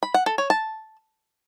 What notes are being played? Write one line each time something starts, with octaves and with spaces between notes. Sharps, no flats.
B5
F#5
A4
C#5
A5